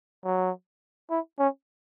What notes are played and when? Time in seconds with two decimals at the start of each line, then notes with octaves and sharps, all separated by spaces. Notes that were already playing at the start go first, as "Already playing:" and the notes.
0.25 F#3
1.11 E4
1.39 C#4